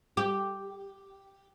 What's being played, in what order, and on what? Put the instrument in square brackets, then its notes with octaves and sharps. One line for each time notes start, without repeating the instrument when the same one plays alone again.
[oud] G4